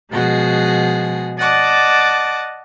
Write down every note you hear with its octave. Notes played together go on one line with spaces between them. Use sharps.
B2 F3 G#3 F#4 G#4
D5 D#5 F#5 A5 D6